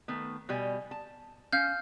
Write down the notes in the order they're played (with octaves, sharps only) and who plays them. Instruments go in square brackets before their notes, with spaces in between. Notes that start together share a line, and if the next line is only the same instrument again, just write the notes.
[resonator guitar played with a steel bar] D#3 A3 B3
B2 G3 G#5
A5
[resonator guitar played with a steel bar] C#4 [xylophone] F5 F6 G6